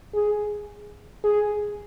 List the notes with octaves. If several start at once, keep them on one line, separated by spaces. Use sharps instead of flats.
G#4
G#4